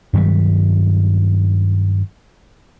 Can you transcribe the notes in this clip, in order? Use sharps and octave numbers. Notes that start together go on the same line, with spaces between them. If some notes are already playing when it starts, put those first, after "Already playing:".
G2 D#3 F#3 G3